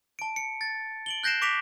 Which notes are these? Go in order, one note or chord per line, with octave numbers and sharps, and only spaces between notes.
A5 D7
C#7
A6
D7 F#7 G7
F#6 G6 A#6 C7 D7 E7
C#6 D6 A#6 B6 D7 F7